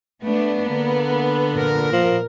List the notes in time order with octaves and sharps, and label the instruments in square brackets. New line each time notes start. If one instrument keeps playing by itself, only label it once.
[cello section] A3 D4 [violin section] B3
[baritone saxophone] D3 [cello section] A#3
[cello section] A#2 A#4
[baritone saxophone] F3